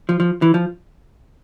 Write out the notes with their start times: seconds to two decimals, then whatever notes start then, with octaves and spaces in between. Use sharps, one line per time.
0.09 F3
0.20 F3
0.42 E3
0.54 F3